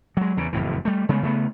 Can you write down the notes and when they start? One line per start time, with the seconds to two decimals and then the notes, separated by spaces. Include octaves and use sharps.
0.17 F#3 G#3
0.37 E2 C#3
0.53 F#1 F2 A2 E3
0.85 G3 A3
1.09 C#3 G#3 A3 B3
1.23 C#3 A3 B3